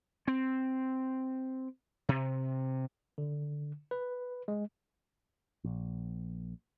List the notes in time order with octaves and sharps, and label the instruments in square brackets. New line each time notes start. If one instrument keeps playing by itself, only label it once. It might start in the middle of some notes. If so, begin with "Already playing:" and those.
[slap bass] C4
C3
[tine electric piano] D3
B4
G#3
[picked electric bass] A#1